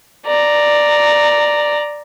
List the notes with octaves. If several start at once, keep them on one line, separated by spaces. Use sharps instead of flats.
D5 A#5